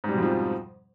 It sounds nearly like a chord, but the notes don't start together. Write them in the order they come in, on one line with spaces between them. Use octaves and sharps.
G#2 G3 B2 F2 F3